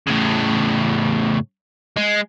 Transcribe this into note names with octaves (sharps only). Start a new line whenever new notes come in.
A2 C#3
G#3